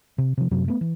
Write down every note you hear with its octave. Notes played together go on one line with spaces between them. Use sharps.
C3
C3 F3
F#2 C3 F#3
A3 B3
E3